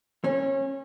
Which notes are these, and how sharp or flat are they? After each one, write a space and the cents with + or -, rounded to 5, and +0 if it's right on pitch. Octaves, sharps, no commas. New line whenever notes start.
C#4 -25